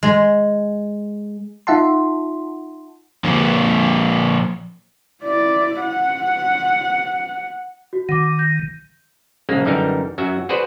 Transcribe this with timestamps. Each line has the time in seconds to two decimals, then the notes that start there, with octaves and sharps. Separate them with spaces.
0.03 G#3
1.67 D#4 F4 E5 F#5 A5 C6
3.24 F3 A#3 C#5
5.23 E4 D5
5.81 F#5
7.93 F#4
8.09 D#3 F#5 D6
8.39 G6
9.49 A#1 F#2 C#3 G#3 A#3
9.65 F#2 D3 E3 G3 D#4 A#4
10.18 F#2 F#3 F#4 E5
10.49 F#4 G#4 B4 C5 D5